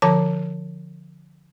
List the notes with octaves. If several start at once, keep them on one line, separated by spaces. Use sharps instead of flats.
D3 F3 A5